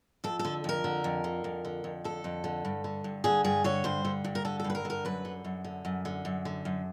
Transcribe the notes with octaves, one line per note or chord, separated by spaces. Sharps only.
F2 A4
A4
D3
F2 A#4
D3
F2
D3
F2
D3
F2
D3 A4
F2
D3
G2
D3
G2
D3 G#4
G2 G#4
D3 C#5
G2 C5
D3
G2
A#4
D3 A4
A4
G2
B4
A#4
D3
A#4
F#2 B4
D3
F#2
D3
F#2
D3
F#2
D3
F#2